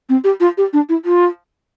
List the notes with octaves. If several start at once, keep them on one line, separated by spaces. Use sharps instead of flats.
C4
G4
F4
G4
D4
E4
F4